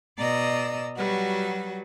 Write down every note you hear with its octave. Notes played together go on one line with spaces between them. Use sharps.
B2 D5 D#5 A#5 E6
F#3 G3 F#4 B4